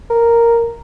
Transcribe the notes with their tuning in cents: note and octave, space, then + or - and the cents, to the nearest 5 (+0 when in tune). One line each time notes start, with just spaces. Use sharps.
A#4 +0